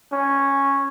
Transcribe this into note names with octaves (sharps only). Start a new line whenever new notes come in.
C#4